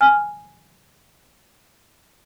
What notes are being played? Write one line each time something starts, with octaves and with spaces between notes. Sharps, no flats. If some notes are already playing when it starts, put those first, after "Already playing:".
G#5 F6